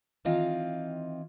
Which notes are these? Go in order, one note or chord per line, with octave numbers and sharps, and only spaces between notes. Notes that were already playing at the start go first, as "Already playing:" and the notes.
D#3 E3 C4 F4 D#5 F5